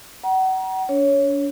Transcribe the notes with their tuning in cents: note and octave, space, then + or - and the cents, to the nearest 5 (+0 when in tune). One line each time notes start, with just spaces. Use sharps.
F#5 +35 A#5 +30
D4 -45 C#5 +0